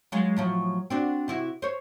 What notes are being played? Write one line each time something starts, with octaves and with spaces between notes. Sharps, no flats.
F#3 G#3 F4
A2 F3 F#3
C4 D4 F#4
C3 E4 F#4
C5 C#5